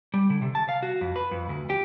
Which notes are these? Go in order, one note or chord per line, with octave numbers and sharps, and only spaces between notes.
G3
D3
C3
A5
F5
F#4
F2
B4
F2
D2
G4